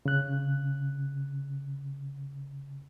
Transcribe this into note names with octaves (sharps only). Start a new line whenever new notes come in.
C#3 F#6